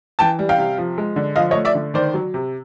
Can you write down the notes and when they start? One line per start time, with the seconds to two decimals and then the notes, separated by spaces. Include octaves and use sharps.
0.19 E3 G5 A5
0.39 G3
0.49 F5 G5
0.58 C3
0.78 F3
0.98 G#3
1.16 D3
1.36 F3 D#5 F5
1.51 C#5 D#5
1.55 A3
1.65 D5 E5
1.75 D3
1.94 D#3 C5 D5
2.14 F#3
2.34 C3